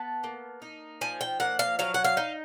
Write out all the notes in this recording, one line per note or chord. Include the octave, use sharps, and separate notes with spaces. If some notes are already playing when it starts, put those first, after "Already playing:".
Already playing: B3 A5
A#3
D#4
F3 G#5
G5
A#3 F#5
F5
F#3 F5
F#5
F5
D#4